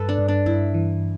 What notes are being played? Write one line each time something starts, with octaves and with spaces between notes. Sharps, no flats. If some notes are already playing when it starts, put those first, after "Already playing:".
Already playing: G2 A4 B4
D4
G2
D4
G2 E4
E3